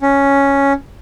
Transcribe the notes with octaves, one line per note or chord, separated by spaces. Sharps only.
C#4